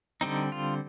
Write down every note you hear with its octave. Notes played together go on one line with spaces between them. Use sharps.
D3 G3 C4 D#4
F4